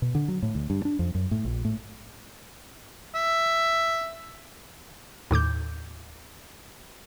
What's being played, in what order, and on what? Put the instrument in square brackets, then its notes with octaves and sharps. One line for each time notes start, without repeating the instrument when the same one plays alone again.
[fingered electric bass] B2
D3
F#3
A2
D2
G2
D4
F2
F#2
A2
A#1
A2
[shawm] E5
[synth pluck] D#2 A2 D6 G6